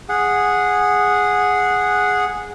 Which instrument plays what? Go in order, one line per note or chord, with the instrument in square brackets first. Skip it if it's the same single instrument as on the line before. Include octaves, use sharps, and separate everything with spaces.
[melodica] G#4 F#5